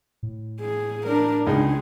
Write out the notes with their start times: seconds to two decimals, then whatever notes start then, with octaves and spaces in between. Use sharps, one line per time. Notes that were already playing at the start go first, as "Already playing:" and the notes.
0.23 A2
0.61 G#4
1.07 D4 A#4
1.46 C#2 G#3 D4 D#4 G#4